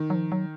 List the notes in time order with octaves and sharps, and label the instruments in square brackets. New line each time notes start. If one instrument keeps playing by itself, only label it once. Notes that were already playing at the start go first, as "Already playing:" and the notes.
Already playing: [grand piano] D#3
[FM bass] F#3
F3
F#3